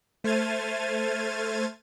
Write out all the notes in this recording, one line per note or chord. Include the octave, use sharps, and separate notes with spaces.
A3 C5 F6 G#6 A6 D#7